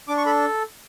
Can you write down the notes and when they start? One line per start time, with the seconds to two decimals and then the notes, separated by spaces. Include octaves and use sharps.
0.08 D4 D6
0.18 C#6
0.26 A4 B5